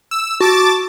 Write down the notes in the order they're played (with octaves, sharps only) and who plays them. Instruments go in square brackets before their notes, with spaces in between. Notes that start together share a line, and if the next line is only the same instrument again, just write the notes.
[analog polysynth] E6
[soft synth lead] F#4 [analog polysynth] A5 D6 A6